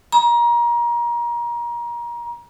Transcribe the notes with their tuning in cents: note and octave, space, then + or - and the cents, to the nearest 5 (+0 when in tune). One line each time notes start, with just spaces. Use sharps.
A#5 +30